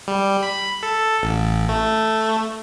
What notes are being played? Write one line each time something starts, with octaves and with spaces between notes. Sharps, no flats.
G3
B5
A4
A1
A3